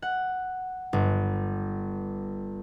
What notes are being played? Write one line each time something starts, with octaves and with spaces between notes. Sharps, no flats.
F#5
G1